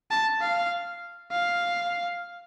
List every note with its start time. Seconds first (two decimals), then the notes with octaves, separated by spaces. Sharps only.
0.11 A5
0.41 F5
1.32 F5